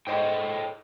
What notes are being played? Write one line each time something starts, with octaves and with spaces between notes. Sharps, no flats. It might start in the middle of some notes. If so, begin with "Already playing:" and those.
G#2 A4 C5 C#5 D#5 G5